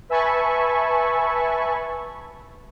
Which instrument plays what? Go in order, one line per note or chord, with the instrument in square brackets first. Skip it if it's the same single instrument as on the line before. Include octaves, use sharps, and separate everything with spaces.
[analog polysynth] B4 E5 G#5 A5 B5 C#6